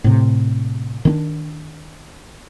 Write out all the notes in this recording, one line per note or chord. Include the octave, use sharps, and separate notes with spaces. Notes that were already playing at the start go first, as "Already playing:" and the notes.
A2 C3
D#3 C4 D4